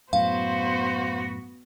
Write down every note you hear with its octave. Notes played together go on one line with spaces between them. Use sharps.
F#2 A2 B3 F#4 C5 F5